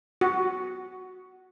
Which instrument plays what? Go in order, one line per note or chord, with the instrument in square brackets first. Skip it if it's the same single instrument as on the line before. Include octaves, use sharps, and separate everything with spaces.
[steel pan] F#4